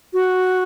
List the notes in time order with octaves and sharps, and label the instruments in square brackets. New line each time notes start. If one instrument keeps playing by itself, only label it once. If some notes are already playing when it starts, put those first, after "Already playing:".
[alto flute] F#4